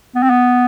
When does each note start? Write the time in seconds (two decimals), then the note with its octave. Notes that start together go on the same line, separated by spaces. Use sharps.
0.15 B3
0.23 C4
0.30 B3